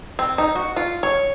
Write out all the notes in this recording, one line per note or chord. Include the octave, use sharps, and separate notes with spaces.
C4
D#4
F#4
F4
C#5